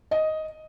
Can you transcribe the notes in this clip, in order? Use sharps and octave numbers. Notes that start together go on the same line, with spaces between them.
D#5